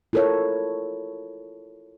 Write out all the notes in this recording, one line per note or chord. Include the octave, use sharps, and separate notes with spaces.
E4 F4 A4 A#4 C#5